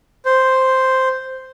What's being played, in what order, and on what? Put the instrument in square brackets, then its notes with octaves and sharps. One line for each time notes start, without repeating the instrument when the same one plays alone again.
[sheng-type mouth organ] C5